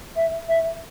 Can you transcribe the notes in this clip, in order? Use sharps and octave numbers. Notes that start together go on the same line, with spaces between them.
E5
E5